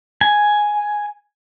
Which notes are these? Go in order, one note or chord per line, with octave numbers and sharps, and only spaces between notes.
G#5